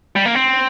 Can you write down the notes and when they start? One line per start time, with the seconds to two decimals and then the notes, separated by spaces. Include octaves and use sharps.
0.16 G3
0.26 A#3
0.35 C4